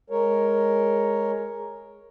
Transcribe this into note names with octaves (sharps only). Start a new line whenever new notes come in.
G#3 A#4 C#5